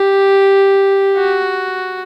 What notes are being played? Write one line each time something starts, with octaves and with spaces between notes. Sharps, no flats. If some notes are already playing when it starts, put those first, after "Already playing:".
Already playing: G4
F#4